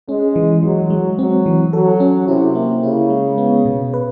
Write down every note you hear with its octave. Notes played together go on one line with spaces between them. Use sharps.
G#3 C#4
E3
E3 F#3
G#3
F#3 C4
E3
F#3 A4
C#4
C3 E4
A#3
C#3 E4
G#3
B3
B2
B4